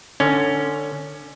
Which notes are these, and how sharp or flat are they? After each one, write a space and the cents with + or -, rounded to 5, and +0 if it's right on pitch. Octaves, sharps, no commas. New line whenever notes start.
D3 +20 C#4 +5